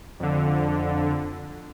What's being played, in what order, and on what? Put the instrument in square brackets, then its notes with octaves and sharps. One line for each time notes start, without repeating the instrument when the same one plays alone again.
[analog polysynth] F2 D3